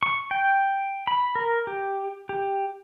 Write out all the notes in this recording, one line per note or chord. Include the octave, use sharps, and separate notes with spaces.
C#6
G5
B5
A#4
G4
G4